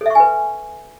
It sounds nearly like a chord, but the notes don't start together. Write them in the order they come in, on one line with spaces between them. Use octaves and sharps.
A4 E5 C#6 G#5 B4